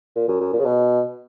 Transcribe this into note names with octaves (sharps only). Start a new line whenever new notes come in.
A#2
F#2
F#2
A#2
C#3
B2